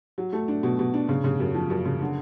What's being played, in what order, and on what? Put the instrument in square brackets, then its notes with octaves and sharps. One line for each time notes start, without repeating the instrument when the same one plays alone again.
[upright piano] F#3
A3
D4
B2
B2
D4
C#3
C#3
F#2
F3
F#2
C#3
D3